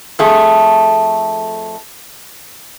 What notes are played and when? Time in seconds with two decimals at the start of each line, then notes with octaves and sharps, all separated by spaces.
0.19 F2 A3 G#4